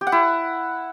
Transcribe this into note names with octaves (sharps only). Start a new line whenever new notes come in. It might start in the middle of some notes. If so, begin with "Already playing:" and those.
G4
F#5
E4